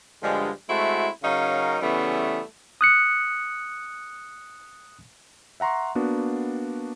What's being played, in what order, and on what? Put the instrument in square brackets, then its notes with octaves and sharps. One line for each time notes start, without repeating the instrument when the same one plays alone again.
[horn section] G2 D3 F3 G3 G#3
G#3 A3 C4 E4 F#4
C#3 F#3 C#4 D#4 A#4 F5
C#3 E3 G3 A3 B3 C#4
[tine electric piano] D#6 F#6 C#7
[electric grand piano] E5 F#5 A#5 C6 C#6
A#3 B3 D4 F#4